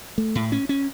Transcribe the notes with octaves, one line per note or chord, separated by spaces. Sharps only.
A3
A2
C#4
C#4